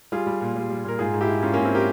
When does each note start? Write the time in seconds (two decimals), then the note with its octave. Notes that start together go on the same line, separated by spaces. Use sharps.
0.12 G3 F4 G#4
0.27 G3
0.41 A#2
0.55 G3
0.70 G3
0.85 A#2 A#4
0.99 G#2 F4 G#4
1.14 G#2
1.21 E4 G4
1.28 G#2
1.43 G#2 C#4 F4
1.53 G#2 A#3 C#4
1.64 C4 E4
1.75 G4 A#4